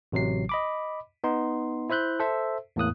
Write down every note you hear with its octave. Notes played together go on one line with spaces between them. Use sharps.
A1 C3 F#3 C7
D#5 B5 D6
B3 D#4 C6
E4 C5 E5 F#6 G6
A4 C5 E5
E2 A2 A#3 D#6 F#6